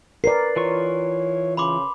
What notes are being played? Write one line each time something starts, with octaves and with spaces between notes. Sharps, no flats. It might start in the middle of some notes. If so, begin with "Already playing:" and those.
A#4 B4 D5 C7
E3 F4 C#5 C#6
C#3 B5 C6 D6